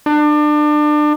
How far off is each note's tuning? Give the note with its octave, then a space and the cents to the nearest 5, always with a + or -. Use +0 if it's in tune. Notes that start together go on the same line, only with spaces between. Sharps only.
D4 +30